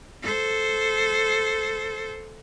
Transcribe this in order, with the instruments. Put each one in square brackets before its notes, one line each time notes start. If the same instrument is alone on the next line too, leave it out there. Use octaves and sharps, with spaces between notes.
[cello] A4 C5